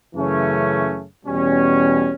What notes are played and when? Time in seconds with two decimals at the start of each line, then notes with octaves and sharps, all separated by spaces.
0.14 F#2 C#3 E3 A3 C#4
1.26 E2 B2 G3 C#4